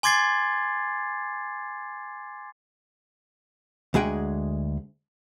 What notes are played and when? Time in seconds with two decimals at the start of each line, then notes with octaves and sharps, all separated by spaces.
0.03 G#5 C6 D6 G#6 A6 C7
3.94 D2 G#3 G#4 F#5 G5